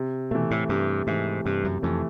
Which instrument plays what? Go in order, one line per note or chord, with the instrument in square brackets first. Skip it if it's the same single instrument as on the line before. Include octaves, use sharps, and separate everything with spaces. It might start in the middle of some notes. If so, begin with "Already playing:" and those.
Already playing: [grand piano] C3
[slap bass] B2 [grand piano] E3 A3
[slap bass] A2
[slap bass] G2 [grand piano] C3
[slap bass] G#2 [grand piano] E3 A3
[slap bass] G2 [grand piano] C3
[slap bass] F#2
[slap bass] F2 [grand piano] E3 A3